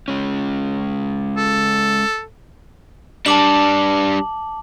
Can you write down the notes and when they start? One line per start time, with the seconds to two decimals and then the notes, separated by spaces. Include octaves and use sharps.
0.08 G#3 C#4
1.37 A4
3.26 G3 D4 A5 D6 F#7